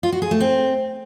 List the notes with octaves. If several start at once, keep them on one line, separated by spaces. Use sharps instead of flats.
F4
F#4
G#4
A3
C4